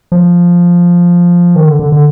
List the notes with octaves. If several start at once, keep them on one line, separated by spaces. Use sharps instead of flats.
F3
D#3
D3
D3
D3